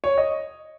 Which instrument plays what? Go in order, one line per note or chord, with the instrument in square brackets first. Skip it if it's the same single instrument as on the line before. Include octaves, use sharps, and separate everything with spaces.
[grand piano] C#5
D#5